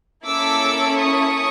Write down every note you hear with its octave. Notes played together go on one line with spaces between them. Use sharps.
A#3 C#4 E4 A4 D6 E6
C#6 D#6